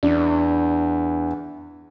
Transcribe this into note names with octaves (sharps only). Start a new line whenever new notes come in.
E2 D4